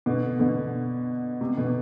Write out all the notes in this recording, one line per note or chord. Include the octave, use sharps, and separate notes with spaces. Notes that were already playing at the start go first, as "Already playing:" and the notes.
B2 D3
B2 D3
C3
B2 D3